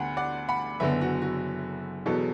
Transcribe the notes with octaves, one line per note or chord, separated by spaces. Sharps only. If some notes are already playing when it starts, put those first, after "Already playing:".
Already playing: D2 D3 B3 F#5 B5
D5 F#5
F#5 B5
F#1 F#2 D3 B3 B4 E5
F#4
F#4
E1 E2 B2 F#3 B3 A4